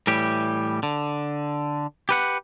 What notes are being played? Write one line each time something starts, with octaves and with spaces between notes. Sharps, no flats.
A2 E3 G3 G4
D3
G4 B4 F#5